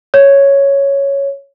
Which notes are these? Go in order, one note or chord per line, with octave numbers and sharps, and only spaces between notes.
C#5